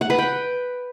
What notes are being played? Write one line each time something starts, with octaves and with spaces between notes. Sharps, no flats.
F#5
B4
G5